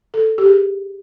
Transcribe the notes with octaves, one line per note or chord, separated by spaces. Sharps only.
A4
G4
G#4